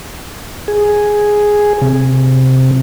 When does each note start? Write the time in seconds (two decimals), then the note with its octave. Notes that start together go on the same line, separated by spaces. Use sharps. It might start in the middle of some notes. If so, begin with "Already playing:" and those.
0.68 G#4
1.82 C3